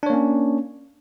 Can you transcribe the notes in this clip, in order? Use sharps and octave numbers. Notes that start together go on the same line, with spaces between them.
A#3 C#4 D4 C#5